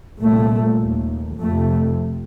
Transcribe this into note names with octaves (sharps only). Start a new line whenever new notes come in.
C2 A#2 A3
D#2
F2 C3 A3